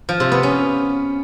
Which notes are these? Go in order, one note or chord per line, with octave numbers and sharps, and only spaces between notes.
F3
C3
B3
C#4